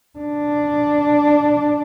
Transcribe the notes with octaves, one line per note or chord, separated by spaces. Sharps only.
D4